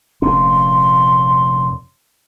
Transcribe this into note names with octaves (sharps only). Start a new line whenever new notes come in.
F1 A#2 C#4 C6